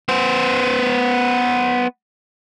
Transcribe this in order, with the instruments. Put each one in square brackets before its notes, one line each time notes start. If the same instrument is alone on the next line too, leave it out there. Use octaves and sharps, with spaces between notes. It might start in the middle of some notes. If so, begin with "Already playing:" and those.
[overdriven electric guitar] B3 C5